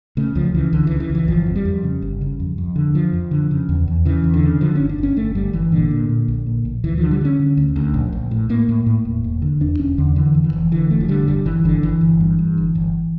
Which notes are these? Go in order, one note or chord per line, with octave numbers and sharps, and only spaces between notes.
C#3 A3
C#2 F3
C#3 E3
C#2 D3
E3
C#3
E3
C#2
E3
G1 F3
F2
G3
F2
C#3
G1
C#3
F2
F2
D3
F2 F3
F2
D3
C#3
E2
E2
C#3 E3
E2
D3
C#3
D3 F3
G1 C#4
D4
G1 C#4
G1 A3
G1 G3
G1 E3
A#2 D3
A#2
A#2
A#1
A#2
A#1
D2 E3
D3 F3
G3
D3 C#4
D3
D2
D2
A#1
A#1
A2
A2 A#3
A2
A2
E1
E1
D3
E2 D4
E1 C#4
E2 D3
D3 E3
F2
E3
F1
D3 E3
F1 A3
F3
D3 G3
G1 G3
G1 E3
G1 D3
G1 E3
G1
G2
G2
G1
G1